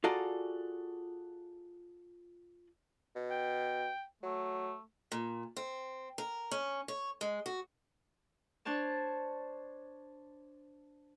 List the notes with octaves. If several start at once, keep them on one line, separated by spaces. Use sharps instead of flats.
F4 F#4 G#4 A4 D5 A#5
B2
G5
F#3 A3
A#2
C4
A#4
C#4
C#5
G#3
F#4
D4 C5 C#5 A5